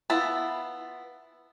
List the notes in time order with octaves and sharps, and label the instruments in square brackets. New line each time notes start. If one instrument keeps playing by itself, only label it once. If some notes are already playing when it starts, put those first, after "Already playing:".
[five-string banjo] B3 E4 F4 A5